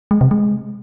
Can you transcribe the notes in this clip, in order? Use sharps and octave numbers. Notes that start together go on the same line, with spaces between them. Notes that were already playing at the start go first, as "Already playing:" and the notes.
G#3
C3
G#3